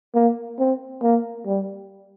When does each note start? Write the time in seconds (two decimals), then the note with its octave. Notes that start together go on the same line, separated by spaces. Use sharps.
0.15 A#3
0.59 C4
1.02 A#3
1.46 G3